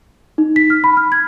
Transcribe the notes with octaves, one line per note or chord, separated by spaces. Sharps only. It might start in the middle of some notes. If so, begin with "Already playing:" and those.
D#4
B6
F6
B5
F6
G#6